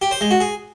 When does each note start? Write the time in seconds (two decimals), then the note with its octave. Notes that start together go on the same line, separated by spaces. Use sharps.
0.02 G4
0.11 C5
0.21 G#3
0.31 F#4
0.40 G#4